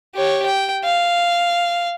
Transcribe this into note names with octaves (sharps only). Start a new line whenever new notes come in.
G4 C#5
G5
F5